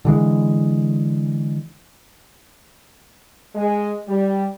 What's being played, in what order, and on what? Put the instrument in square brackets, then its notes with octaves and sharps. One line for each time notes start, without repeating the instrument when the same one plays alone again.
[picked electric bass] D3 E3 G#3
[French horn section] G#3
G3